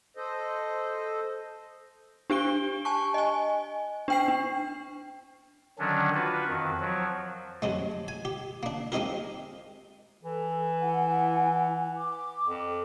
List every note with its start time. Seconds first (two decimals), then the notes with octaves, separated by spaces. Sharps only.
0.17 A4 C5 D#5
2.30 D4 G4 D7 G7
2.85 G#5 A5 C#6
3.14 D#5 G#5
4.08 D4 G5 C7
4.28 D4
5.79 D3 D#3 F#3 C#4 D4
6.14 F4 F#4 B4
6.48 F2 D#3
6.81 F3 F#3
7.62 F#2 C3 G#3 A3
8.08 G#5
8.25 G4
8.63 A#3 D4
8.92 G#3 C4 D#4 G4 A#4
10.23 E3 A4
10.82 E4 F#5 G#5
11.96 D6
12.47 F2